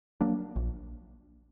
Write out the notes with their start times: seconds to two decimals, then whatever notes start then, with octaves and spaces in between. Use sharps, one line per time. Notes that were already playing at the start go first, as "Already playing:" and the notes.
0.21 F#3 A#3 D4
0.56 A#1